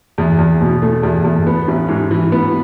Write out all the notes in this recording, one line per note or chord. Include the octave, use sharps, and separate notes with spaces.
E2
E2
B2
A3
E2
E2
B3
A1
G#2
E3
B3